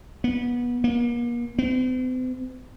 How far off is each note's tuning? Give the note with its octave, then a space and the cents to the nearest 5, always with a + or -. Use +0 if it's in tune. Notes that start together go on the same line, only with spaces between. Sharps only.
B3 -25
A#3 +40
C4 -45